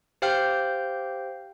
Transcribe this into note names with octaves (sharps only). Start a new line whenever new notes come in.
G4 C5 F5 G5 F6 G6